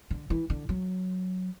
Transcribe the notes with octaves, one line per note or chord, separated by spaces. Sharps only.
D3
E3
D3
F#3